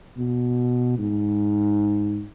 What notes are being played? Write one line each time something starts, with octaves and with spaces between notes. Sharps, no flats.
B2
G#2